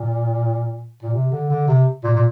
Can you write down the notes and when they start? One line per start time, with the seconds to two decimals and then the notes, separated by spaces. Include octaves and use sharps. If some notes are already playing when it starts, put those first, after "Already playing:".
Already playing: A#2
1.03 A#2
1.14 C3
1.32 D3
1.50 D3
1.68 C3
2.04 A#2
2.15 A#2